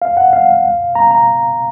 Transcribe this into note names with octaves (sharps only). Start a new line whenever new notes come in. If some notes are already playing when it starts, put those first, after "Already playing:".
F5
F#5
F5
A#5
A#5